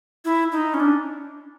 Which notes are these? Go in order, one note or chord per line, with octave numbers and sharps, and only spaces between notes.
E4
D#4
C#4
D4